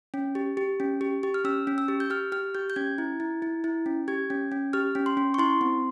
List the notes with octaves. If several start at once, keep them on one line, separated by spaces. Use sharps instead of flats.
C#4
G4
G4
C#4
G4
G4
F6
C#4 E6
C#4
E6
G4
G6
G4 F6
G4 F6
G4 G6
G6
C#4 G#6
E4
E4
E4
E4
C#4
G4 G#6
C#4
C#4
G4 F6
C#4
C6
C#4
C#6
E4 C6
C4